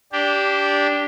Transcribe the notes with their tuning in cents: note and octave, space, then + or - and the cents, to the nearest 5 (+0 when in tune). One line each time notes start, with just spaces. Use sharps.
D4 -15 G4 +0